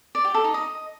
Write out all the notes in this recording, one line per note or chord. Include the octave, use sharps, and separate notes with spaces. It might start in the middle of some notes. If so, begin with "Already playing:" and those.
D5
G4
A4
D#4
D#5